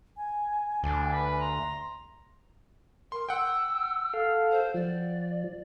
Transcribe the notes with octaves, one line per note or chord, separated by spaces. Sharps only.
G#5
D2 D4
B4
A#5 C6
A#4 C6
F#5 G5 E6
A4 F5
C5
F3 D5